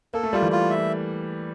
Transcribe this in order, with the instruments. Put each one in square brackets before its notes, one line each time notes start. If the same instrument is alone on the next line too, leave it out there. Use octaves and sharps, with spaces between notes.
[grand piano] A#3 [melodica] A4
[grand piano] A3
[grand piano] G3 [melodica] F4
[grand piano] E3
[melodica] F4
E5